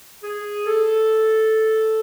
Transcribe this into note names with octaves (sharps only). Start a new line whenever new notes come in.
G#4
A4